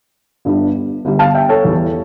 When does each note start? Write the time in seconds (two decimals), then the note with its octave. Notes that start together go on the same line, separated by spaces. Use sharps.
0.45 G1 G2 D3 G3
1.05 G1 G2 D3 G3
1.19 F5 A5
1.35 E5 G5
1.49 A4 C#5
1.65 E2 E3 G3